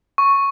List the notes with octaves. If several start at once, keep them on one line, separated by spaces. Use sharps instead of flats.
C#6